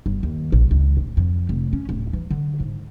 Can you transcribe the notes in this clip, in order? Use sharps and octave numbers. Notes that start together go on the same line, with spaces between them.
G1
D#2
A#1
C#2
D1
F2
F1
C#4
D1
E3
D3
G#2